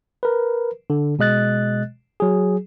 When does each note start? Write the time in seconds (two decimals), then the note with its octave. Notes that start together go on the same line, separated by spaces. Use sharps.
0.23 A#4 B4
0.90 D3
1.19 B2 G#3 D#5 F#6 A6
2.20 F#3 G#4